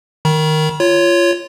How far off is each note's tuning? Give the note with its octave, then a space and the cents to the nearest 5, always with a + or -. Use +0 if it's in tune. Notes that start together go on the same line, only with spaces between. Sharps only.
D#3 -5 B5 -45
F4 -15 C#5 +5